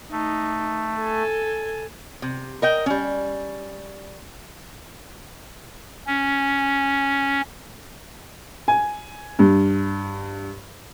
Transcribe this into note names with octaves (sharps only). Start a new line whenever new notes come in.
A3 D#4
A4 G#5
C3
A#4 D#5 G5
G3 C#4
C#4
G#5
G2